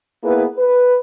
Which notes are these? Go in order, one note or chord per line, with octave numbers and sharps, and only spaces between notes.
A#3 B3 E4 G#4 B4
B4